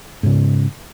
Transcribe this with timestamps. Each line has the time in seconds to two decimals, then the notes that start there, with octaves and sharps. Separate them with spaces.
0.23 G#2 C#3